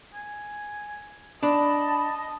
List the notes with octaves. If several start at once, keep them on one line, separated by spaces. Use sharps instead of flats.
G#5
D4 D#5 A5 B5